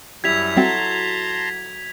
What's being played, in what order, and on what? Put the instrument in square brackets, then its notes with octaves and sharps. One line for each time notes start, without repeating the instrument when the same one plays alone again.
[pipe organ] F#2 [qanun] G3 E4 [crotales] G#6 B6 F7
[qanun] F#3 A4 [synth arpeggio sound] G3 C4 E5 [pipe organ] A5 A#5 C6